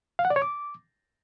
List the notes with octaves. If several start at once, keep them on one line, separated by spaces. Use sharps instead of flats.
F5
F#5
D5
C#5
D6